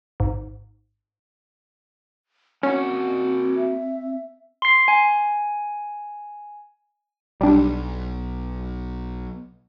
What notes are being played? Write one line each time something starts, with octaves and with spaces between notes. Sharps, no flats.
G#1
A#3 C4 C#4 F#4 F#5
E5
C6 C7
G#5
B1 G3 D4